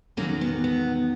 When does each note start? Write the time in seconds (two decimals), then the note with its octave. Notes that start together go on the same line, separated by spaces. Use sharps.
0.17 E2 D#3 F#3 A#3 C#4
0.41 B3
0.64 B3